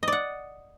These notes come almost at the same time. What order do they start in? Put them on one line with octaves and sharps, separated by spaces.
D#5 D5 F#5